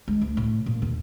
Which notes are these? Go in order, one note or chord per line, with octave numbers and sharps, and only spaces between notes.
G#3
D2
A2
A#2
D#2